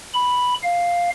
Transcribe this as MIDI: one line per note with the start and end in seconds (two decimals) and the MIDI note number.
0.14 0.54 83
0.63 1.10 77